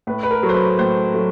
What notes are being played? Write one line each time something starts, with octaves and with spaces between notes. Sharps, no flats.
A2 B4
B4
A#4
F#3 A3
C5
B4
A2 C5
F#3 A3